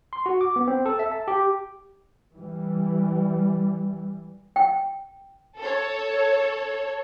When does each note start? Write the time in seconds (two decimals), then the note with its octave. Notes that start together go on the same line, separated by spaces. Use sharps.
0.13 C6
0.26 F#4
0.41 D6
0.56 B3
0.68 C4
0.86 A4
0.99 E5
1.12 A5
1.28 G4
2.34 E3 G3
4.56 G5
5.59 A4 C#5